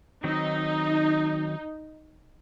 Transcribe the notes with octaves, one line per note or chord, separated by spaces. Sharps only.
D#3 F#3 C4 D#4